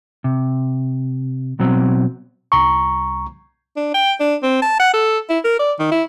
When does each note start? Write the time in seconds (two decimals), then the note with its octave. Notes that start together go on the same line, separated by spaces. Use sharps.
0.24 C3
1.60 B2 F#3 C4
2.52 C2 A#5 C#6
3.77 D4
3.94 G5
4.20 D4
4.43 C4
4.62 A5
4.80 F#5
4.94 A4
5.30 E4
5.45 A#4
5.59 D5
5.80 D#3
5.92 E4